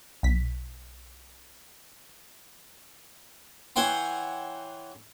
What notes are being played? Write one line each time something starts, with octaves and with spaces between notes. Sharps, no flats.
B1 B6
E3 C#5 F#5 G5 C6